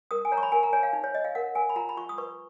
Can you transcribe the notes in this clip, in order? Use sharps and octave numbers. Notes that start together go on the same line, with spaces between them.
A#4 D#6
G#5
C#5 A#5
C#6
B5
A#4 G#5
A#5
C#5 G#5
F5
D#4
C#5
C#5 D#5
F5
A#4 F#5
A#4 G#5
B5
F4 A#5
B5
F4 C#6
D#6
B4 C#6